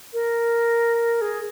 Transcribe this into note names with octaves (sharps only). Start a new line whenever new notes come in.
A#4
G#4